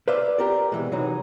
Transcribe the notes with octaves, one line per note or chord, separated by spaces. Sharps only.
B4 C5 D5 E5 F5
G4 A#4 D5
B2 E3 G#3
C3 E3 F#3 D#4